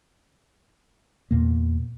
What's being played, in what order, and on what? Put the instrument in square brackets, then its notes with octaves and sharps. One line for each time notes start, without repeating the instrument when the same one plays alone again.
[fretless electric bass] E2 A#2 A#3